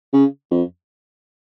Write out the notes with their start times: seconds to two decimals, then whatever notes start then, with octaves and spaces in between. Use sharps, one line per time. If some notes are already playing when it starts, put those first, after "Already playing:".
0.13 C#3
0.51 F2